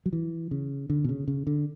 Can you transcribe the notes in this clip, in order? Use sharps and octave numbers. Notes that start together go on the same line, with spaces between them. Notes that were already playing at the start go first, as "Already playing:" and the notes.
F#3
E3
C#3
D3
B2
C#3
C#3
D3